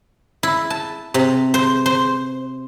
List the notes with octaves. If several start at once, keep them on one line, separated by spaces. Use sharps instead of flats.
E4
A5
C3
C5
C5